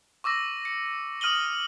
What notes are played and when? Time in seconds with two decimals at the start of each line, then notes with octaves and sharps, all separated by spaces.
0.24 C#6 D6 E6 A#6
0.65 C#7
1.21 D#6 F6 D#7 F#7 G7